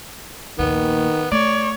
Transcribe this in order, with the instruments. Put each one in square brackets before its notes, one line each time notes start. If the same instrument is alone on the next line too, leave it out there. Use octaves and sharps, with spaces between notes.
[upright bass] A#1 D#2 [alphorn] D#3 [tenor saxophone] B3
[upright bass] A3 [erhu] C#5 [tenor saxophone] D5